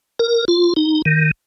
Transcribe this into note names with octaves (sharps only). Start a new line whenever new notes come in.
A#4
F4
D#4
D#3